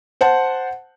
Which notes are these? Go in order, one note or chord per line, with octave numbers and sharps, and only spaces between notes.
C5 F#5 A5